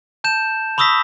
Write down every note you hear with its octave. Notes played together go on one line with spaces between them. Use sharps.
A5 G6 E7
B5 C#6 D#6 E6 A#6 B6